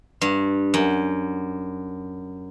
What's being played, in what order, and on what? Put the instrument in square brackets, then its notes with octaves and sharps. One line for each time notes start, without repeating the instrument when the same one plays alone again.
[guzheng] G2
F#2